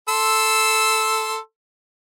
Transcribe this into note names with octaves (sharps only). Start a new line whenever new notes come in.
A4 C6 E6